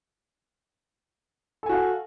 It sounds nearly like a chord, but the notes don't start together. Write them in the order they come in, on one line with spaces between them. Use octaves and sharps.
A4 G#5 F#4 F5